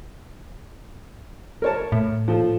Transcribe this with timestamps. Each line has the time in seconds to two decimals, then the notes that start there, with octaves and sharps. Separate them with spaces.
1.62 A#4 C#5 A5
1.92 A2
2.28 F3 A4